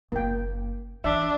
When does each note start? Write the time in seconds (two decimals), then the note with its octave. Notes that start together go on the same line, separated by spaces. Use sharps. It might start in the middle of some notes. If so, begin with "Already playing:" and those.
0.12 F#1 A#3 G5
1.04 E3 D4 E5